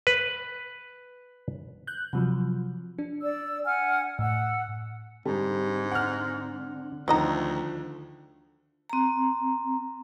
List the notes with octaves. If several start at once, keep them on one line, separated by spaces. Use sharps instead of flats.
B4
F#6 G6
C3 F3 F#3
D4
D5 E6
F#5 G#5 F6
A2 F#5 E6
G#2 D3 G3 C4 D4
F#5 F6
D2 D3 D#3 F3 F#3 D#5 A#5
C4 A#5